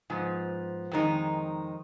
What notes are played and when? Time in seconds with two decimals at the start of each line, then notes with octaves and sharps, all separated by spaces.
0.10 G#2 F3 B3
0.91 F2 D#3 G#3 D#4